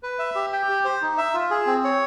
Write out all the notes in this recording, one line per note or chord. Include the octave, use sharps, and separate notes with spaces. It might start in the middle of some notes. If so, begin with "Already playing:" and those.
B4
E5
G4
G5
G4
C5
D#4
E5
F4
G#4
C4
C#5